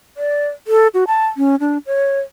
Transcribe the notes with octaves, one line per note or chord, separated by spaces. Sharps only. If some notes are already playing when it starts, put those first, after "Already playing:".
D5
A4
F#4
A5
C#4
D4
C#5